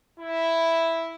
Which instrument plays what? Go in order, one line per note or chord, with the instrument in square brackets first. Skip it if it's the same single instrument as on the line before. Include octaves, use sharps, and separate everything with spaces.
[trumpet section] E4